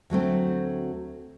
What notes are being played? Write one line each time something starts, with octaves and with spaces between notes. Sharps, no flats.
D2 F#3 A3 C4